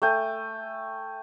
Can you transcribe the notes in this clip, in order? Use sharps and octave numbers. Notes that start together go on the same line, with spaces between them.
A3 G5 G#5